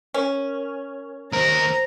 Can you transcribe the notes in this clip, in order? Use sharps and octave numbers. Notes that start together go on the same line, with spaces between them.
C#4 A#4
D#2 A#4 C5 A#5